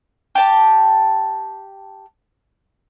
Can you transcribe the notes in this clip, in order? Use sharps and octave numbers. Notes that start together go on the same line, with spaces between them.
G4 A5